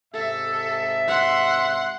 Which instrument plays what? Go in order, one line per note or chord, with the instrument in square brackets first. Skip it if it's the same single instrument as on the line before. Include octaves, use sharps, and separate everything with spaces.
[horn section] G#2 C3 E5 [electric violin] A4
[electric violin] F#5 C6